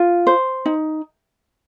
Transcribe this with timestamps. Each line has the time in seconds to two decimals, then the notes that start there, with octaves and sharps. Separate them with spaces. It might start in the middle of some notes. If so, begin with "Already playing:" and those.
Already playing: F4
0.27 C5
0.66 D#4